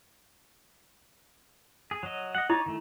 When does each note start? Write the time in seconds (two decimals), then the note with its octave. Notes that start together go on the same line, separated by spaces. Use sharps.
1.91 G#4
2.03 F#3 D#5
2.35 D#5 F#5
2.50 D#4 E4 C#5 D5
2.66 D#3 A3